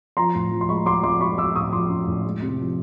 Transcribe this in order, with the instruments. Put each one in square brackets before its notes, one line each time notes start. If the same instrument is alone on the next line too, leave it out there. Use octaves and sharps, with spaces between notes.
[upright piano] F3 A#5 C6
A2
F3
C6
G#3 B5 C#6
G#3 C6 D6
F3 C6 D6
G#3 B5 C#6
G#3 D6 E6
A2 C#6 D#6
F3 C6 D6
C#4
A2
G#3
C3
F3